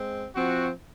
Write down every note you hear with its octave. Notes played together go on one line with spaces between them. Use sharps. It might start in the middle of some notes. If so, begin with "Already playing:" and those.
Already playing: G#3 C4
F3 C4 F#4